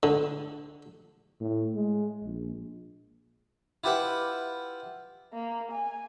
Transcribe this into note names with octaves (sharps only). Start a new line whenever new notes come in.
D3
A2
G#3
A#1
E4 F4 G4 B4 E5 F#5
A#3
G#5